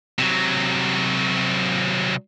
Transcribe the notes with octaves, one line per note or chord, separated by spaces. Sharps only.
C3 F#3